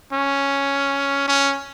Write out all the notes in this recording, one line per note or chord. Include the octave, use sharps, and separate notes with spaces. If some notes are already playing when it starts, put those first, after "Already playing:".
C#4
C#4